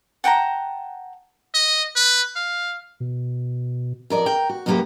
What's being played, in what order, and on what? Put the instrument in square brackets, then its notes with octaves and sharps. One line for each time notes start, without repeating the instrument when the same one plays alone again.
[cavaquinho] F#5 G5 A5 A#5
[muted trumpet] D#5
B4
F5
[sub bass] B2
[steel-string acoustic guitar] F2 A#4 D5 D#5
A#4 G5
F#4
F#2 C3 F#3 A#3 G4 B4